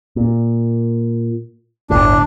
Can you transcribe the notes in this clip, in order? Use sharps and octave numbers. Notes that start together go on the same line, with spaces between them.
A#2
G1 D2 A2 D4